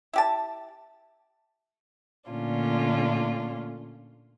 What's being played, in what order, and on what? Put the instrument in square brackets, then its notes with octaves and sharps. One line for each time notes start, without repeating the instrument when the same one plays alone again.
[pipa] E4 G4 A5
[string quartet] A#2 D3 A3 C#4 D4 F4